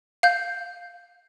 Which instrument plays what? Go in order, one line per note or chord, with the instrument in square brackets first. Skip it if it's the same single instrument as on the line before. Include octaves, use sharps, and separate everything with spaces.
[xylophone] F5 G6